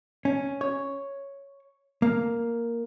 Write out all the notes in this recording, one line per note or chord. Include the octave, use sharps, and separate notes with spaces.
C#4
C#5
A#3